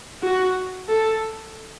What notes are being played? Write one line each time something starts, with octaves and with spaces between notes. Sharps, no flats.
F#4
A4